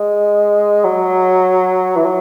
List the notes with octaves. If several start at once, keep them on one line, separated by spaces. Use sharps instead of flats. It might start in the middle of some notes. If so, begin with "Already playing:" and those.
Already playing: G#3
F#3
E3
F#3